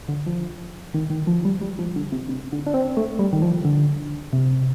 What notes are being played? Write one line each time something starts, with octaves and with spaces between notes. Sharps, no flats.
D3
F3
D#3
D#3
F3
G3
G3
F3
D3
C3
C3
D3
D4
C4
A3
G3
D#3
F3
D3
C3